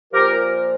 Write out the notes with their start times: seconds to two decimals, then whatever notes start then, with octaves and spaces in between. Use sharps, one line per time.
0.13 A#2 F3 G4 A#4